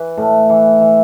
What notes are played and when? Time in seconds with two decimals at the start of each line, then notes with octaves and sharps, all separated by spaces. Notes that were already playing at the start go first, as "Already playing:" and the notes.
Already playing: E3 B4
0.17 A2
0.50 E3
0.81 E3